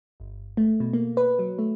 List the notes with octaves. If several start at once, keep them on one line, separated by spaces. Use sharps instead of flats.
G1
A3
B2
A#3
B4
F#3
A3